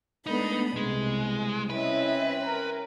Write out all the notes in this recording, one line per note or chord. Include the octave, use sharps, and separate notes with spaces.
G#3 A3 B3 D4 D#4 B5
C2 B2 G#3
C4 C#4 E4 B4 D#5 E5
A#4